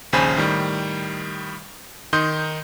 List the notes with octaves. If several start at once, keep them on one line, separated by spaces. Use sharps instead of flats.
A#1 D#2 C#3 C5 G#5 B5
A2 D#3 G3
D#3 D#4 C6 D#6 G6